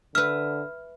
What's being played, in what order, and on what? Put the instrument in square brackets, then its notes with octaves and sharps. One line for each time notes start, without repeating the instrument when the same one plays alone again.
[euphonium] D3 [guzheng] B4 E5 [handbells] F6